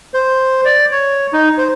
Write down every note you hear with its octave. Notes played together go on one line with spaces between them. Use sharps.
C5
D5
C#5
D#4
C5